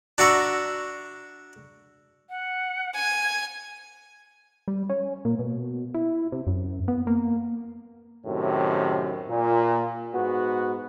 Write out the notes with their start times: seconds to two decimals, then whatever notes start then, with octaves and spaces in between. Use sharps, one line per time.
0.18 D4 F#4 E5 A#5 C#6
2.30 F#5
2.95 G#5 G#6
4.68 G3
4.89 C#4
5.25 A#2
5.39 B2
5.94 E4
6.32 C3
6.47 F#2
6.88 B3
7.07 A#3
8.25 F#2 A2 C3 D#3
9.29 A#2
10.13 G#2 B3 F#4